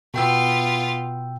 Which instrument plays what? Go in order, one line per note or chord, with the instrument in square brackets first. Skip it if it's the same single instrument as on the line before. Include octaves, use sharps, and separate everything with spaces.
[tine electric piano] B2 G5 E6 [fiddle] B3 F4